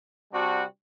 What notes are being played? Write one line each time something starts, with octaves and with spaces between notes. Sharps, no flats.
C3 G3 D4 F#4